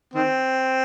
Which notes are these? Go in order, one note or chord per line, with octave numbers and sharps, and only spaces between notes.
D#3 C4